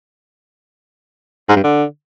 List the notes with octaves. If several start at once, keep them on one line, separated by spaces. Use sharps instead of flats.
G#2
G2
D3